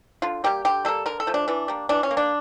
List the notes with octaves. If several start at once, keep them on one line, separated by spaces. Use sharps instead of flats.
D3 F4
G3 A#3 G4
D3 G4
G3 A#3 A4
D3 A#4
A4
F3 A3
D4
E3 D4
G3 A#3
E3 D4
C#4
A#3
D4